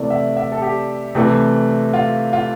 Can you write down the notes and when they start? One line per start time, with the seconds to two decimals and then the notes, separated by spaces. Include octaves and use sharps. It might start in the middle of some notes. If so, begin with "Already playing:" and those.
Already playing: C3 E3 A3 D5
0.10 E5
0.37 E5
0.52 A4
0.62 G4
1.15 C3 E3 A3
1.94 F4
2.33 F4